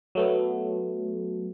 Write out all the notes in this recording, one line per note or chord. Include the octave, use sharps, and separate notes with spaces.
F#3 A3 B3